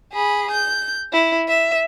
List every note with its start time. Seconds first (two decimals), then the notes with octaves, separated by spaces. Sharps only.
0.13 G#4 B5
0.51 G6
1.13 E4
1.48 E5